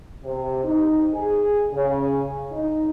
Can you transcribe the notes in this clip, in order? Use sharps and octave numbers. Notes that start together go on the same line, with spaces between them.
C3
D#4
G#4
C#3
D#4